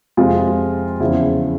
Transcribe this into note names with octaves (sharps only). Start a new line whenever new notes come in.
F2 C3 F3 G#3 F4
E2 C#3 F3 E4